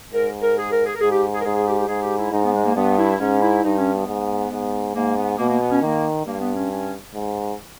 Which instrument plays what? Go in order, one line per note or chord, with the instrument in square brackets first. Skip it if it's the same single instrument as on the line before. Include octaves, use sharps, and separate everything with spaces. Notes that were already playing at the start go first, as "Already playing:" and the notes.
[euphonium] G#2 [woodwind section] A#4
[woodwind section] A#4
G#4
A#4
G#4
A#4
[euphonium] G#2 [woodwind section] G#4
[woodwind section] G4
G#4
A#4
[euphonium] G#2 [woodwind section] G#4
[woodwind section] G#4
G4
G4
[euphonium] G#2 [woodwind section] G#4
[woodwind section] G4
E4
[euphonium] G#2 [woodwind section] D#4
[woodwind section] B3
G#3
A#3
[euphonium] G2 [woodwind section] B3
[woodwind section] E4
[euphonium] G#2 [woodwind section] C#4
[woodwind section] E4
[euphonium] G2 [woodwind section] D#4
[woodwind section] C#4
B3
[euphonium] G#2
G#2
[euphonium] G#2 [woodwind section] A#3
[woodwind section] B3
[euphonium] B2 [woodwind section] A#3
[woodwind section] A#3
B3
C#4
[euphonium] D#3 [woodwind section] A#3
[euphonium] G2 [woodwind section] A#3
[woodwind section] B3
C#4
C#4
[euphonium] G#2